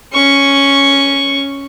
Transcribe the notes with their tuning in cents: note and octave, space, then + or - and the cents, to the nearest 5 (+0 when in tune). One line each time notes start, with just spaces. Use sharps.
C#4 +0 C#6 +0